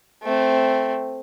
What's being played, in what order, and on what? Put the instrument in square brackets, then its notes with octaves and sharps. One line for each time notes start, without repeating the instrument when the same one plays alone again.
[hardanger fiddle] A3 C4